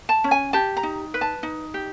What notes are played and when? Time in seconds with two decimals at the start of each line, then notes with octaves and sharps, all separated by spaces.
0.09 A5
0.24 C#4
0.31 G#5
0.53 G4 A5
0.77 A#5
0.83 D#4
1.14 B4
1.21 A5
1.43 D#4
1.74 G4